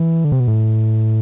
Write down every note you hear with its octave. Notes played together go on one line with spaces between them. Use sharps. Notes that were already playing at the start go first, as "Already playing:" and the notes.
Already playing: E3
D3
C3
B2
A2